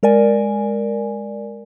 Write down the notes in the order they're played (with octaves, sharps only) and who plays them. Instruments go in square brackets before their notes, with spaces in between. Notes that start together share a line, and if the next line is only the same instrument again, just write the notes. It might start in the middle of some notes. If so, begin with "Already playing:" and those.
[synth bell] G#3 A#4 D5 G#5